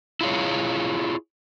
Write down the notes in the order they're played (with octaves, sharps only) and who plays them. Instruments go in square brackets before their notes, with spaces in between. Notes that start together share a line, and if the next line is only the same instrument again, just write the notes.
[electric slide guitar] E4 F4 G#4 C#5